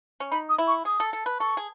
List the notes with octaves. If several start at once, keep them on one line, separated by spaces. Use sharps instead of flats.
C#4
D#4 B5
D#6
E4
C#6
G#4 D#6
A4
A4
B4
A4 C#6
G#4